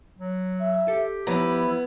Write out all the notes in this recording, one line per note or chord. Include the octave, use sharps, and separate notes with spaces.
F#3
E5
G4 A4
F3 B3 E4 C#5 A#5 B5